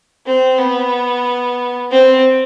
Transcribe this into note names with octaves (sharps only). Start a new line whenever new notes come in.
C4
B3
C4